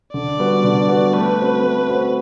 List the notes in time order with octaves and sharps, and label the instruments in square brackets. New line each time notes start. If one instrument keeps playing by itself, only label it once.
[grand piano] D3 [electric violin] D5
[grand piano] G3 B3 F#4
D3
G3 B3 F#4
[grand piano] A3 [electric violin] B4
[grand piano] C4 F#4 C5
A3
C4 F#4 C5